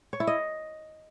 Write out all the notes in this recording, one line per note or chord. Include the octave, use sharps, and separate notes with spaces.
C#5
E4
D#5